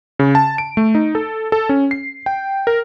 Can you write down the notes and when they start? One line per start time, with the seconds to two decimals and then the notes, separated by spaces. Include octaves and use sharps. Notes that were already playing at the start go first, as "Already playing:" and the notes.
0.19 C#3
0.35 A5
0.58 D7
0.77 A3
0.95 D#4
1.15 A4
1.52 A4
1.69 C#4
1.91 C7
2.26 G5
2.67 A#4